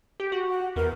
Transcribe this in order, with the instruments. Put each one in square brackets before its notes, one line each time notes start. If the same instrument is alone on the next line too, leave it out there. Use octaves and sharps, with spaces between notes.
[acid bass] G4
F#4
[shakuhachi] F#5
[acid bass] E2 [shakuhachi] A#4